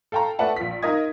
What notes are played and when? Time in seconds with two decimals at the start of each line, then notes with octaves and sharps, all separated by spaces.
0.12 A4 F5 G5 A5 A#5
0.39 A3 B4 D5 E5 F#5 A5
0.56 A#1 F4 B6
0.83 D#4 F4 A#4 D#5 D#6 G#6